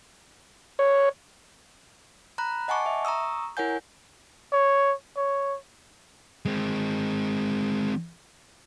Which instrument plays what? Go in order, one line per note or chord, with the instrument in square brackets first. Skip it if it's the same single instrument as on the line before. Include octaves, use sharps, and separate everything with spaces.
[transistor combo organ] C#5
[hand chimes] A#5 B5 F#6
D#5 F#5 G#5 A5 C#6 D6
E5
A#5 C#6 D#6 E6
E4 A#4 C#5 F#5 G#5 G6
[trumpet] C#5
C#5
[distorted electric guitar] G#3 C4